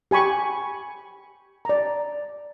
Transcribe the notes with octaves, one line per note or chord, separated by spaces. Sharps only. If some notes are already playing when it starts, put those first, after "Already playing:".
G4 G#5 B5 C#6
D5 A#5